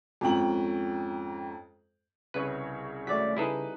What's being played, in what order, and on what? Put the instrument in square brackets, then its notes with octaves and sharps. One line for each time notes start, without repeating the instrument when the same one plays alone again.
[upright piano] F2 G#2 C#4 G5 A#5 F#7
[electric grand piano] C2 C#3 C#5 [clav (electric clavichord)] B4
[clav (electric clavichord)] G#1 F#3 [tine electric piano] A3 D5 B6
[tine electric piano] C#3 [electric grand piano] G3 D#4 B4 [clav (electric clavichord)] E4 G#4 A4